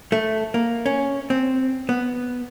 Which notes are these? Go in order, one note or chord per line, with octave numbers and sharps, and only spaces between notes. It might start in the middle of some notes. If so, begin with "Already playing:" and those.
A3
A#3
C#4
C4
B3